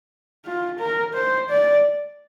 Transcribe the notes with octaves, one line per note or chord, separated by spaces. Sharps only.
F4
A#4
C5
D5